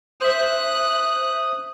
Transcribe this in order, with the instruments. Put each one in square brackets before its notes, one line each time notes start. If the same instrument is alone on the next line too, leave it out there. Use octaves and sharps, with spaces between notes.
[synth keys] C5 E5 [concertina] D#6 [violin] F#6